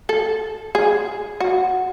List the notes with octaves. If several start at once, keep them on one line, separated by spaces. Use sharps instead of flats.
A4
G#4
F#4